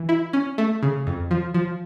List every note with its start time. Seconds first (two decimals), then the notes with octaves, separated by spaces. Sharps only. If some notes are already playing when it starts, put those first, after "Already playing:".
Already playing: E3
0.09 E4
0.33 C#4
0.58 A3
0.83 C#3
1.07 F2
1.31 F3
1.54 F3